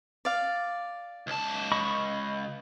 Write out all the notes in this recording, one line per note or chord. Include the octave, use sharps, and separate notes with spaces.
D5 F5
C#2 A5
D#5 B5 C#6